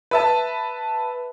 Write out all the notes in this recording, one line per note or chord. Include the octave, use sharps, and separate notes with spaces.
B4 E5 A5